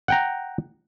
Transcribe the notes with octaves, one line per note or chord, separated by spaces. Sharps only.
F#5 G5 A#5